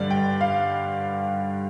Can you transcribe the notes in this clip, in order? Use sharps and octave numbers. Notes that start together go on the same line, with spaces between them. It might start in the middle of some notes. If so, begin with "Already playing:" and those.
Already playing: G2 D3 G3 D5
G5
F5